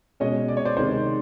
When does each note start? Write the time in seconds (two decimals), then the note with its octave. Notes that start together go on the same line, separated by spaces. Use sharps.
0.20 B2 G#3 C#4 C#5 D#5
0.48 D5
0.57 C#5
0.65 C5 D5
0.77 C3 D#3 G#3 C5 D5